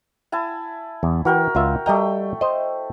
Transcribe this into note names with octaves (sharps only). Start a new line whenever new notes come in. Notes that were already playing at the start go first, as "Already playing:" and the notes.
E4 G#5 A5
E2
E3 F#4 A#4 G5
C#2 F4 E5
G3 A3 D#5 G5 A#5
C5 D#5